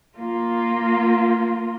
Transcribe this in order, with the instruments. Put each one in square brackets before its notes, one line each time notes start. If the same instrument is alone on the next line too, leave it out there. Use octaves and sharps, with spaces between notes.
[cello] A#3 F4